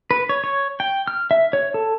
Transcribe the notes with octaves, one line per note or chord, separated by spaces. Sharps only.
B4
C#5
C#5
G5
F6
E5
C#5
A4